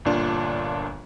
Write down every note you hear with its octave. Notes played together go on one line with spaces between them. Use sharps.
G1 A#2 D4 F4